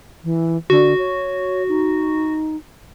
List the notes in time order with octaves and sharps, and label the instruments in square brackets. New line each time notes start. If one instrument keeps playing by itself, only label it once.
[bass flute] E3
[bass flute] D3 [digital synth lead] F#4
[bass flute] C#5
D#4